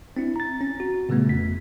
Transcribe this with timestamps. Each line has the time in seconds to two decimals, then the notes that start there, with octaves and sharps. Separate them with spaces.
0.17 C4 D4 E4
0.36 A#5 A6
0.61 C#4
0.80 F#4
1.09 A#2 C#3 G3 A3 B3
1.28 G1 F2 B6